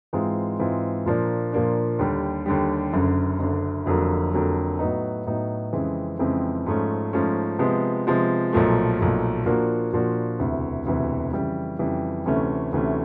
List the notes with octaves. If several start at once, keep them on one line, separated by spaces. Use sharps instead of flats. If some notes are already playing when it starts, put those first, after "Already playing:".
G#2 E3 G#3 C4 F4
G#2 E3 G#3 C4 F4
A#2 F3 A#3 D4
A#2 F3 A#3 D4
D#2 D3 G3
D#2 D3 G3
F#1 F#2 D3
F#1 F#2 D3
F1 F2 D3 F#3 A#3
F1 F2 D3 F#3 A#3
A2 F#3 B3 D#4
A2 F#3 B3 D#4
F2 C#3 E3 G#3 C4
F2 C#3 E3 G#3 C4
G#2 F3 A3 C#4
G#2 F3 A3 C#4
C3 F3 G#3 B3
C3 F3 G#3 B3
B1 A#2 F3 A3
B1 A#2 F3 A3
A#2 F3 A#3 D4 F#4
A#2 F3 A#3 D4 F#4
E1 D2 C3 E3
E1 D2 C3 E3
F2 C#3 E3 G3
F2 C#3 E3 G3
D2 C3 E3 A3 C#4
D2 C3 E3 A3 C#4